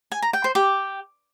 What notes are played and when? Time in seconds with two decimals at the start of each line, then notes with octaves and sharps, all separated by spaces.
0.12 G#5
0.22 A#5
0.33 G5
0.44 C5
0.55 G4